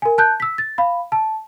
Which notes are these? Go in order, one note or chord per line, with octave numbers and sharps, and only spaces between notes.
A#4 G#5
A5 F#6 G6
E6 B6
A6
F5 B5
A5